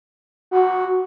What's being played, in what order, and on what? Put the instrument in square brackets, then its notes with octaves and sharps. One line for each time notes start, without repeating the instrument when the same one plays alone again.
[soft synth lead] F#4